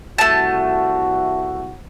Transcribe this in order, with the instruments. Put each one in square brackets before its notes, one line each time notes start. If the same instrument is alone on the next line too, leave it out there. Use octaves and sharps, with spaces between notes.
[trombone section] C2 F#4 [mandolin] A3 A5